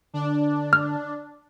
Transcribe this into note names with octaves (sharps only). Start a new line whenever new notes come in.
D3 D4
F6